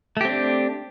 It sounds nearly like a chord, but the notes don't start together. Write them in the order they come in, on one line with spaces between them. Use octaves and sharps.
A3 G4 C4 D4